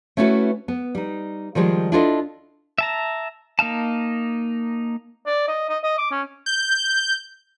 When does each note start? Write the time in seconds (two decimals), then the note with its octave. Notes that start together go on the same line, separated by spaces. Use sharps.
0.17 A3 C#4 D4 E4 F#4 B4
0.68 B3
0.95 G3 D#4
1.55 D#3 F3 G3 G#3
1.92 D4 E4 F4 A4 C#5 D#5
2.78 E5 A5 A#5
3.59 A#3 D#4 F5 A5
5.26 D5
5.48 D#5
5.69 D#5
5.84 D#5
5.98 D6
6.11 C#4
6.46 G6